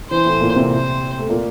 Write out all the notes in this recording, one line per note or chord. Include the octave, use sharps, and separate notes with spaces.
E3 C5
A2 A3
A#2 A#3
C3 C4
C5
A3
A#2 A#3